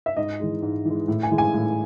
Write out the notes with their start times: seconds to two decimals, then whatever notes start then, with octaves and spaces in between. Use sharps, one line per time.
0.06 E5
0.17 G#2 D#5
0.40 E3 G#3
0.62 G#2
0.85 E3 G#3
1.08 A2
1.23 G#5
1.31 E3 G#3
1.38 G#5
1.54 A2